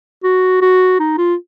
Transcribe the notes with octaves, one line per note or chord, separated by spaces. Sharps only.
F#4
F#4
D#4
F4